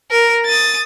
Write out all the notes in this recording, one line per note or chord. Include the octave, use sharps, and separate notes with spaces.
A#4
D#6 A6